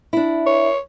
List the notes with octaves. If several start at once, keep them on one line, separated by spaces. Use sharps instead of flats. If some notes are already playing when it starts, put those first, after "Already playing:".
D4 E4
C#5